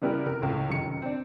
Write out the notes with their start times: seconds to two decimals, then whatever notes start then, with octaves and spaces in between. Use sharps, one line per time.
0.02 C#3 G3 B3 E4 G4 A#4
0.26 F1 C3 A#4
0.42 C#2 A2
0.68 F1 F#2 D#3 C#7
1.02 C4 D4